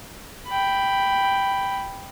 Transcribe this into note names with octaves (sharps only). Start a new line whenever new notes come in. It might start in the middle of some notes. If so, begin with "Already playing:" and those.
G5 B5